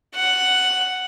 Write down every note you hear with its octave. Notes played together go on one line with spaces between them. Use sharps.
F#5